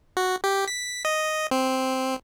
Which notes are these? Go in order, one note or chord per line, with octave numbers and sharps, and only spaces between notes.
F#4
G4
B6
D#5
C4